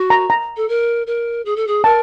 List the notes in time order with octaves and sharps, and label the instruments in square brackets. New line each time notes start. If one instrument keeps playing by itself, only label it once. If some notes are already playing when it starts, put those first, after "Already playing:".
Already playing: [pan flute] F#4
[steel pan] A#5
A#5
[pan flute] A4
A#4
A#4
G#4
A4
G#4
[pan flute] A#4 [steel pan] A5